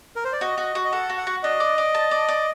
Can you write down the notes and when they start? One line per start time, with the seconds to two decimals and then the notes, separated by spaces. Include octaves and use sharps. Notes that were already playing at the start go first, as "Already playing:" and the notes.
0.16 A#4
0.25 C5
0.33 D5
0.41 F#4 D#5
0.58 F#4
0.75 F#4
0.85 D#5
0.92 A4 F#5
1.10 F#4
1.18 F#5
1.27 F#4
1.43 D4 D#5
1.60 D5
1.78 D5
1.95 A5
2.11 D5
2.28 D5